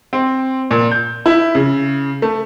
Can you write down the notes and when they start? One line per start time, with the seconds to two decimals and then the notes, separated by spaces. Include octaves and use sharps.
0.13 C4
0.71 A#2
0.91 G6
1.26 E4
1.55 C#3
2.22 A3